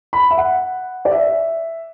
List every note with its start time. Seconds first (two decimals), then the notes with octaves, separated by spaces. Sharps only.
0.13 B5
0.31 E5
0.38 F#5
1.05 D5
1.11 E5